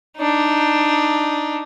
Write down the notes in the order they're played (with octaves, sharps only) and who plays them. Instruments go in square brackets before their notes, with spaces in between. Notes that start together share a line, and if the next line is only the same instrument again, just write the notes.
[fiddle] D4 D#4